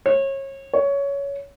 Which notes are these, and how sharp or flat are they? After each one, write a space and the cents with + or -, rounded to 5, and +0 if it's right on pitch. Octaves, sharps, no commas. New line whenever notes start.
C#5 -30
C#5 +15